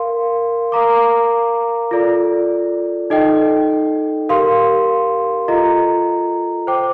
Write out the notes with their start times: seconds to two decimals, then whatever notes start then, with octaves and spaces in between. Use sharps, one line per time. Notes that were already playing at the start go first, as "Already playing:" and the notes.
Already playing: A#4 F5 C6
0.72 A#4 F5 A#5 D6
1.91 F4 A4 D5
3.10 D#4 A4 D#5 G5
4.29 G4 A#4 F5 C6
5.48 F4 A4 D#5 A#5
6.67 C5 G5 D6